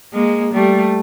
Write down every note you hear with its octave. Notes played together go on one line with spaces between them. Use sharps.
G#3 A#3
G3 A3